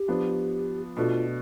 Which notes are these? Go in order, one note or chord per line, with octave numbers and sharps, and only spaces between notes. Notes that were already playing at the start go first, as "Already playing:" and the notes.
Already playing: G4
F3 B3 D4
B2 A3 D4 F4